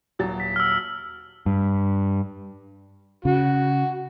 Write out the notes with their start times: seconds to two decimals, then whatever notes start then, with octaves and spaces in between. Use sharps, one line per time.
0.19 D#1 F#3 A6
0.40 B6
0.56 E6 F6
1.46 G2
3.25 C#3 F#4